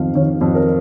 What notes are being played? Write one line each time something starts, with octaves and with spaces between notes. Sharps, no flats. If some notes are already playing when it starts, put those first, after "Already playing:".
Already playing: F2 D#3 F5
D#3 C#5
F2
A#4